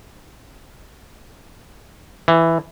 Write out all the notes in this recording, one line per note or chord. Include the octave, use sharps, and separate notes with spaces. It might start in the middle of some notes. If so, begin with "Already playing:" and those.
E3